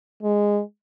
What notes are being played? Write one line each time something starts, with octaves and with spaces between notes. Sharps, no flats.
G#3